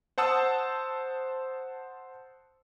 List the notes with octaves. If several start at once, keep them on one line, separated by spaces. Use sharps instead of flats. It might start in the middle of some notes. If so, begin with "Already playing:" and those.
C5 F#5 A5 D#6 E6